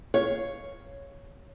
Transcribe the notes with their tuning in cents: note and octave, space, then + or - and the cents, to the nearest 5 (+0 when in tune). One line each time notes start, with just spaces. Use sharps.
C#5 +0 F5 +0